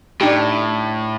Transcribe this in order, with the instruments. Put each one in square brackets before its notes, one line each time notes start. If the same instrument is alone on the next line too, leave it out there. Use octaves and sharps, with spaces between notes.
[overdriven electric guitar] A2 [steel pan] D4 D#4 G4